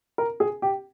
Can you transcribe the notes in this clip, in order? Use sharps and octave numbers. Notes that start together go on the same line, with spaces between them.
A#4
G#4
G4